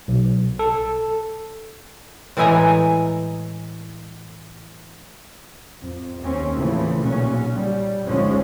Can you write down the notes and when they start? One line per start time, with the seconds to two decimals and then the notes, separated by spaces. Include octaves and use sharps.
0.08 B1
0.59 A4
2.37 A2 E3 G#3 E5 G#5 A#5
5.81 F2
6.23 D#2 C4 C#4
6.55 A2 C#3 E3 F3 A3
6.99 B1 A#2 C#3 F#3 C#4
7.56 G3
8.06 G#1 D2 F3 G#3 C#4